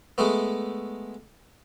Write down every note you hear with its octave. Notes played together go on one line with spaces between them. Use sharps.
G#3 A3 B3